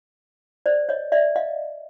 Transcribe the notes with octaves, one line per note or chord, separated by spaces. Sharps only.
C5 D5
C#5 D#5
D5 E5
D#5 F5